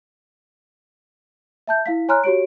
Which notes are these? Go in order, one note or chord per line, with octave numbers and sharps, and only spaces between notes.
E5 A5 G6
E4 F5 B6
C#5 G#5 A#5 C6 F6 F#6
F#4 G4 C#5 D7